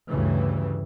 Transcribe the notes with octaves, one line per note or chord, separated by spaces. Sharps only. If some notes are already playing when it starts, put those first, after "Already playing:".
D2 G2 C#3 E3